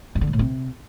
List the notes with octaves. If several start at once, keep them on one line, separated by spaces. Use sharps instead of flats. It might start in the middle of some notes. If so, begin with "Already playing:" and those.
G2
D3
G#2
A2
C3